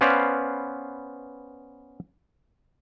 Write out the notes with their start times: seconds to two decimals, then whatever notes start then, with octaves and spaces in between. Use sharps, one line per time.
0.01 B3 C#4 B4 C5 D5 F5